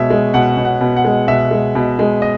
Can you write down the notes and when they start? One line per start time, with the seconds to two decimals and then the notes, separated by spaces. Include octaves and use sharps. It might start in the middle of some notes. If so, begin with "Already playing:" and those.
Already playing: B2 G#3 C#5 E5
0.10 G#3
0.34 B2 F#5
0.57 B2
0.65 F#5
0.81 B2
0.96 F#5
1.05 G#3
1.28 B2 E5
1.51 G#3
1.75 B2
1.99 G#3
2.22 D#5